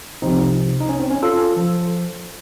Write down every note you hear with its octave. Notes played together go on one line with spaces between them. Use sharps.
C2 C3 F3 C4 D#4
D#4
C#4
C4
C#4
F4 A4
F3